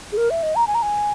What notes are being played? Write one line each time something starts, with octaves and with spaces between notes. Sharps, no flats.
G#4
A#4
E5
D#5
A#5
G#5
A#5
G#5